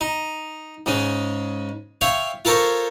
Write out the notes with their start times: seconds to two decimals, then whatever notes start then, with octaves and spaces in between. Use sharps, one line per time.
0.01 D#4
0.86 G#2 C#3 G#3
2.01 C#5 E5 F5 G5
2.45 F4 A4 A#4 C5 C#5